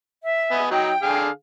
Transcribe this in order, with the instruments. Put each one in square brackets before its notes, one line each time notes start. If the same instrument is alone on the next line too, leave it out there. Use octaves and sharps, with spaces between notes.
[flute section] E5
[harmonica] B3 D#5 G#5
[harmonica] F#3 D#4 F#4 [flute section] G5
[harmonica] D3 G#4 F5